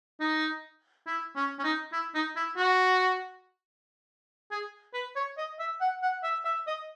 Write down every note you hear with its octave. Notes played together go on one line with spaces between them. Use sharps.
D#4
E4
C#4
C#4
D#4
E4
D#4
E4
F#4
G#4
B4
C#5
D#5
E5
F#5
F#5
E5
E5
D#5